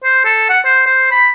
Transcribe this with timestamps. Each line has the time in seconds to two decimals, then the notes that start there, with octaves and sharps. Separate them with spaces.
0.04 C5
0.25 A4
0.49 F#5
0.65 C5
0.86 C5
1.11 B5